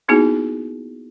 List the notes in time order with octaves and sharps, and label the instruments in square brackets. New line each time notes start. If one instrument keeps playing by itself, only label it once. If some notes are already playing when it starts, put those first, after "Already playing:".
[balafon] A#3 B3 D#4 E4 F#4 G#4